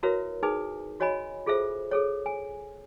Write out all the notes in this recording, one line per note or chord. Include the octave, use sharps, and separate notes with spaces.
E4 F#4 A#4 B4 C#5 E5
D#4 G#4 B4 G#5 D#6
F#4 C#5 D#5 G#5 B5
F4 G#4 A4 C5 E5
G#4 A4 C#5
G#5